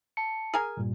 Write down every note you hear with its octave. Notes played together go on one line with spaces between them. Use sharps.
A5 C#7
G#4 A#4 G#5
G2 A#2 G3